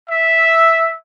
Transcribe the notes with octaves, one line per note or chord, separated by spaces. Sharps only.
E5